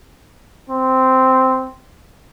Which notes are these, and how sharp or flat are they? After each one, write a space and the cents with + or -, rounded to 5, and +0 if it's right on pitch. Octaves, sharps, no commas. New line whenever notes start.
C4 -5